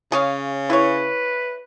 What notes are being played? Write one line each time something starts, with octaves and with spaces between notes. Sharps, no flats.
C#3 G#4 C#5 F5
E4 B4 C#5